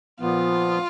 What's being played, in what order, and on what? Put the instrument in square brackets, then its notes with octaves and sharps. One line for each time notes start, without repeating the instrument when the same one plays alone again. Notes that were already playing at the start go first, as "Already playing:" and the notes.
[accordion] A#2 F3 B3 [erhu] F4